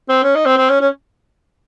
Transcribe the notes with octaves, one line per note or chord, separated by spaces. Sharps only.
C4
C#4
D#4
C4
C4
C#4
C#4